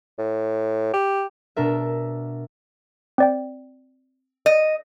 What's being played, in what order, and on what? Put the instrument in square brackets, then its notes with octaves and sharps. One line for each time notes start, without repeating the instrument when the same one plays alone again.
[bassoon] A2
G4
[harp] B2 D4 A#4 E5
[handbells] C4 D5 G5
[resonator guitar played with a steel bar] D#5